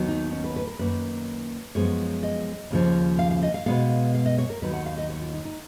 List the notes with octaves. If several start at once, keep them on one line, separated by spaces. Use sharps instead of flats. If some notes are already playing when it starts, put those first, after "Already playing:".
Already playing: D#2 D#3 F#3 B3
D#4
C#4
B4
B4
A#4
F#2 D#3 A#3 B4
F#2 F3 G#3 B3 C#5
D#5
D#2 C#3 F3
F5
F5
D#5
F5
B2 G#3 B3 F5
F5
D#5
C#5
A#4
D#2 D#3 F#3 B4
F#5
F5
D#5
C#5
F4
D#4
D#4